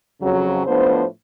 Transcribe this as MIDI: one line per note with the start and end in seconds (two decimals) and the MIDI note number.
0.21 0.65 41
0.21 0.65 49
0.21 0.65 54
0.66 1.04 45
0.66 1.04 53
0.66 1.04 59
0.66 1.04 62
0.66 1.04 72